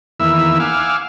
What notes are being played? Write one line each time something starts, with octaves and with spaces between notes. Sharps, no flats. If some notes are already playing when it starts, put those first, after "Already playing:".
E2 D#3 A#3 E4 E5 E6
F5 F#5 G#5 D6 E6 F6